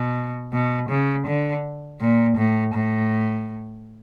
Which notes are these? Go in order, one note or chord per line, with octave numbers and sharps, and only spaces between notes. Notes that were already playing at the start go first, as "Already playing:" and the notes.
Already playing: B2
B2
C#3
D3
A#2
A2
A2